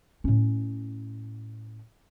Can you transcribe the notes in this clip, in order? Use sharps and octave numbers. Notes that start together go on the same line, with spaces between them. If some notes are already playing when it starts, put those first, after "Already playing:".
A2 C#4